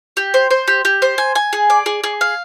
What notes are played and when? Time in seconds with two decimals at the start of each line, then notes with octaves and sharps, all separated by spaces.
0.17 G4
0.34 C5
0.51 C5
0.68 G4
0.85 G4
1.02 C5
1.18 G#5
1.35 G#5
1.53 G#4
1.70 D5
1.86 G#4
2.04 G#4
2.21 F5